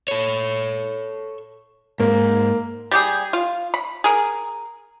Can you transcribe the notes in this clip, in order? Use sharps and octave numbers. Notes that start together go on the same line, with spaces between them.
A4 C#5
G#2 A#3
G3 G4 G#4
F4
B5
G#4 A#4